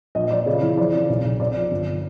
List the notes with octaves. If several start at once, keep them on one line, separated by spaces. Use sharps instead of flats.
A#1 D#5
A#1 D5
C#3
E3
F3 D5
C#3
B1
B1
B1 D5
F3
G1